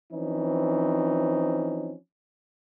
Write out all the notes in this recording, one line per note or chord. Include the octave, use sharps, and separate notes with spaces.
E3 F3 C4 C#4 D#4